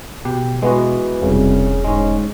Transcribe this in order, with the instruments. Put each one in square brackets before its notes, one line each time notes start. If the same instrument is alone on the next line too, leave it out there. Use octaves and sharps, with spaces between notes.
[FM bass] B2 [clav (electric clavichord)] G4
[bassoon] E3 [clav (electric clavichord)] G#3 B3 F#4
[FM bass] E1 [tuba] C2 [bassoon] C#3
[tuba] G#2 [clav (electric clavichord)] G#3 C#4